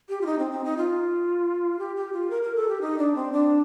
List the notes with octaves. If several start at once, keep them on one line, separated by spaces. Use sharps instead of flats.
G4
F4
D#4
C4
C4
D#4
F4
G4
G4
F4
A#4
A#4
A4
G4
D#4
D4
C4
D4